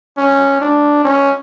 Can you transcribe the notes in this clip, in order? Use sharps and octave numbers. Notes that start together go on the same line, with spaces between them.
C#4
D4
C#4